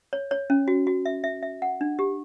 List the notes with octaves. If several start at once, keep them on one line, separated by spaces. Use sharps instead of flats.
C#5
C#5
C#4
F#4
F#4
E5
E5
E5
F#5
D4
G4